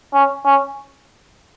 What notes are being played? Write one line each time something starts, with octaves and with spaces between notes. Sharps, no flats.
C#4
C#4